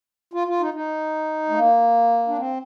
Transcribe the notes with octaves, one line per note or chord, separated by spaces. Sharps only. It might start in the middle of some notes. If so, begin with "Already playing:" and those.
F4
F4
D#4
D#4
A3
A#3
D4
C4